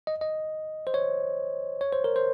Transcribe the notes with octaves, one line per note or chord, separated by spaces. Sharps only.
D#5
D#5
C5
C#5
C#5
C5
A#4
C5